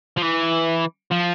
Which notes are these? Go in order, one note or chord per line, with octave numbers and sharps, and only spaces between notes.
F3
E3
F3